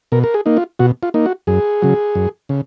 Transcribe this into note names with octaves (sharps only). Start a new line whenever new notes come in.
B2 A#4
A#4
G#4
A#3 D#4
F4
B2 F#4
F4
A#3 D#4
F#4
F#2 G#4
C#3 F#3
F#2
C#3